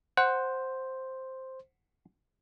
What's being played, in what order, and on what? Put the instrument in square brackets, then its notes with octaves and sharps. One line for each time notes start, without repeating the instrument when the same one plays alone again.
[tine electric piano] C5 [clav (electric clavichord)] F#5